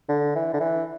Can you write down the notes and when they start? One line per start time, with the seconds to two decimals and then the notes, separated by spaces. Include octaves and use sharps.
0.09 D3
0.35 E3
0.53 D3
0.60 E3